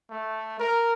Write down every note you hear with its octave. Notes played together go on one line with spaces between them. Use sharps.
A3
A#4